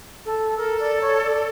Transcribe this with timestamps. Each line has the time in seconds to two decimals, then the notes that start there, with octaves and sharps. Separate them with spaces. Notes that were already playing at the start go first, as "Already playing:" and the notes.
0.26 A4
0.57 A4 A#4
0.80 D5
1.01 C#5
1.23 D5